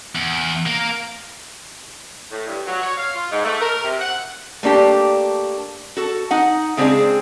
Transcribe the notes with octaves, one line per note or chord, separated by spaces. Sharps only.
E2
A#3 A#4
A2
G2
F#3
C#5
F5
F4
G#2
A3
A#4
C3
F#5
A3 A#3 D4 G4
F#4 A4
D#4 F#5
C#3 G#3 C4 D4 G#4